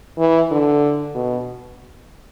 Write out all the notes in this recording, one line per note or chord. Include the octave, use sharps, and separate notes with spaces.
E3
D3
B2